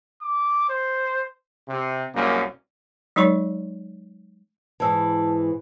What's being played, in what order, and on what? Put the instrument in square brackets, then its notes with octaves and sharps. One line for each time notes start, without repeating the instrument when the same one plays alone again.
[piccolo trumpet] D6
C5
[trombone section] C3
C2 F#2 G#3 A#3
[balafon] F#3 G#3 D#4 C#5 C6 C#6
[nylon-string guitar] G#2 E3 [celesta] A5 E6